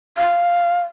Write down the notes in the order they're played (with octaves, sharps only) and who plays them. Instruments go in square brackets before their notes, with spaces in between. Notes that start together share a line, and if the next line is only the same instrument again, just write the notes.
[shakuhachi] F5